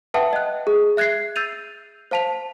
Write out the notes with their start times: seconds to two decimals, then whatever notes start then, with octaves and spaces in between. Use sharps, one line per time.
0.14 B4 E5 F#5 G5 A5 D#6
0.33 D#5 F#6
0.67 G#4
0.97 E5 F#6 G#6 A#6 C7
1.36 E6 G6 A6 D#7 F7
2.11 C5 F5 A5 B6 F7